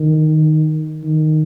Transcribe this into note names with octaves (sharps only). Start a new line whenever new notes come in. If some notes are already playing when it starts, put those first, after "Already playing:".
Already playing: D#3
D#3